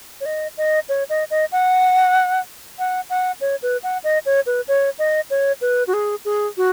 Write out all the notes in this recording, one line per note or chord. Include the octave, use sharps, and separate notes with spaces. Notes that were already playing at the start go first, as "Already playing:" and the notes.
C#5
D#5
D#5
C#5
D#5
D#5
F#5
F#5
F#5
C#5
B4
F#5
D#5
C#5
B4
C#5
D#5
C#5
B4
F#4
G#4
G#4
F#4